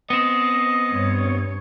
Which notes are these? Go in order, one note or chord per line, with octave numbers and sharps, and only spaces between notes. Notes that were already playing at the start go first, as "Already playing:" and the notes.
B3 C4 D#5
G2 C#5